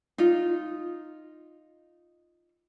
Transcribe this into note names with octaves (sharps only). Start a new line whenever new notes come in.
D#4 F4